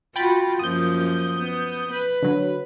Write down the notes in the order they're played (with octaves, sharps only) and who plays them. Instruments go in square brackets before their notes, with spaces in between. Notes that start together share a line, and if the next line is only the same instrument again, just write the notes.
[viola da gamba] F4 F#4 [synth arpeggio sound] G5 B5 A6
[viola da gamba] F#2 F3 A#3 [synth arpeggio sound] D#6 G6
[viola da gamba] B3
B4
[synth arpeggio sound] D3 F#3